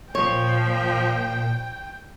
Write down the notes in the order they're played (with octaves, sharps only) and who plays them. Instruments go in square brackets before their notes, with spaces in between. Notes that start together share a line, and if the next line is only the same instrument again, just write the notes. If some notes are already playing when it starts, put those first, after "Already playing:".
[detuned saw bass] A#2 [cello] F3 [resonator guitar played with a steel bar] C#5 [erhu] G5